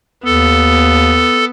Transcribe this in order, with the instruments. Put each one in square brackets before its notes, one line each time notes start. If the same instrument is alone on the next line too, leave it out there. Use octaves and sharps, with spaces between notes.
[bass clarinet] D#2 [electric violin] B3 [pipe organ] A4